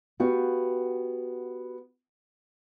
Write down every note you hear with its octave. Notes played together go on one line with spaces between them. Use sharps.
B3 F#4 G4 F5